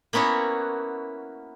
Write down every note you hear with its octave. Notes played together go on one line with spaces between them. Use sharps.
A#3 B3 C#4 E4 F#4